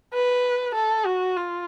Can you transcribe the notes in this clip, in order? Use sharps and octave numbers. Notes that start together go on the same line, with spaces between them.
B4
A4
F#4
F4